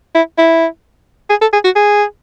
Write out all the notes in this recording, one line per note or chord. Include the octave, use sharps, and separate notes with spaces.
E4
E4
G#4
A4
G#4
F#4
G#4